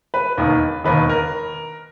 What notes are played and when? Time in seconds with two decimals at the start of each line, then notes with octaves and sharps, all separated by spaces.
0.14 B4
0.37 E1 D#2 D#3
0.84 E1 D#2 D#3 B4
1.09 A#4